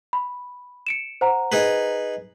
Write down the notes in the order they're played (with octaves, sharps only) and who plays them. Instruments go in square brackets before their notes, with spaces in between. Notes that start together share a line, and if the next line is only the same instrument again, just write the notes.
[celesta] B5
C#7 D7 E7
C5 F#5 A#5
[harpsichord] D#4 G#4 B4